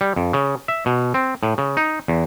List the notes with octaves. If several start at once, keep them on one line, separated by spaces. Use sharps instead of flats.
G3
F2
C#3
E5
B2
C4
A2
C#3
D#4
E2